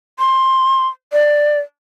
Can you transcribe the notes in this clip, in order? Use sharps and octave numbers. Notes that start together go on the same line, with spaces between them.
C6
D5